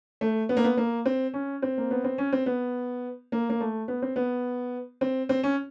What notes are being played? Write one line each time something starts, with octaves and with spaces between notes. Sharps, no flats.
A3
B3
A#3
B3
A#3
C4
C#4
C4
A#3
B3
C4
C#4
C4
B3
A#3
A#3
A3
B3
C4
B3
C4
C4
C#4